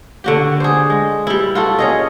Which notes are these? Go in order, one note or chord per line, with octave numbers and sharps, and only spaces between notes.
D3 F#4 G4
G#4 C5
G#3
G3 E4
F4 F#4 A4
C#4 G#4 D#5